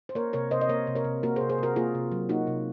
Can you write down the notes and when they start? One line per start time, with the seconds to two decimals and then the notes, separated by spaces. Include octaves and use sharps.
0.09 C5
0.15 A#3 A#4 C#5
0.33 C3 A#4 C#5
0.51 C3 C5 D#5
0.61 D#5
0.69 A#3 A#4 C#5
0.87 C3
0.95 A#4 C#5
1.04 C3
1.23 A#3 F#4 A#4
1.36 G#4 C5
1.41 C3
1.49 G#4 C5
1.58 C3 F#4 A#4
1.76 A#3 F4 G#4
1.95 C3
2.12 F#3
2.29 A#3 D#4 F#4
2.47 C3